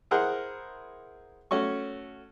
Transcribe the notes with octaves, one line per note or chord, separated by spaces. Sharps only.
E4 G#4 A#4 C5 F#5
A3 C#4 F#4 C#6